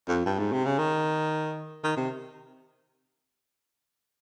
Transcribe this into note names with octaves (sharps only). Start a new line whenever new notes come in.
F2
G2
G#2
C3
C#3
D#3
D#3
C3